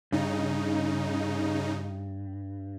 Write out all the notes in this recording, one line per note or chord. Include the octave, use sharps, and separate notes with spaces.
G2 C#3 D#4